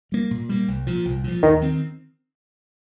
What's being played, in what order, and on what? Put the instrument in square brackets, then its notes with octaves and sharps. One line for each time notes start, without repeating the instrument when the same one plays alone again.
[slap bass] G3 A#3
A#2
G3 A#3
C2
A#2 F3
C2
A#2 F3
[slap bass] D#2 [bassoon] D#3
[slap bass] D#3 C4